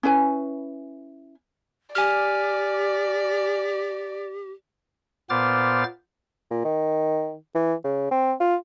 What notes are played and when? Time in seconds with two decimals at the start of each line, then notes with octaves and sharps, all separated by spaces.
0.03 C#4 E4 B4 G#5
1.95 G4 D5 G#5 F6
5.30 A#2 B3 C5 D6 F6 A6
6.51 A#2
6.65 D#3
7.55 E3
7.84 C#3
8.11 C4
8.40 F4